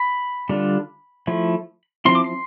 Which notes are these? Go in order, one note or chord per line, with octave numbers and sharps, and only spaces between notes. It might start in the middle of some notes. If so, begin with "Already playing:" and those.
Already playing: B5
D3 G3 D4 F4
F3 A3 E4
F3 C4 E4 C6
D6
C6